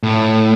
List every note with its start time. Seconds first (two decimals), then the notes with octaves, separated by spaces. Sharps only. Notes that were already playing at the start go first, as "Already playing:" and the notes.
0.03 A2